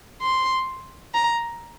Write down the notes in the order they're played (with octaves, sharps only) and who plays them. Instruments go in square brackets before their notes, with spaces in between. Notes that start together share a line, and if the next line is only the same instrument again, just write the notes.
[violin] C6
A#5